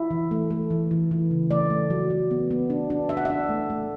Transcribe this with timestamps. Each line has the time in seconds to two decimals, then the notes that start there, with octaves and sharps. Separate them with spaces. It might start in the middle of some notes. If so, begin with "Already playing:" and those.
Already playing: E4
0.11 E3
0.31 A3
0.51 A3
0.70 E3
0.91 E3
1.11 E3
1.31 C#3
1.50 A3 D5
1.70 A3
1.90 F#3
2.10 F#3
2.31 B3
2.51 B3
2.70 D4
2.90 D4
3.09 D4 E5
3.17 F#5
3.25 D4 E5
3.49 A3
3.70 A3